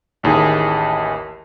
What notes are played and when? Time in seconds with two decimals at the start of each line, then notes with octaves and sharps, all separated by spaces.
0.23 A1 D#2 E4 G#4